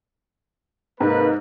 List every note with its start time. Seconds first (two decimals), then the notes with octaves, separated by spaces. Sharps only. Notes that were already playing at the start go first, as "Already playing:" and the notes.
1.01 G#2 C3 A#3 B4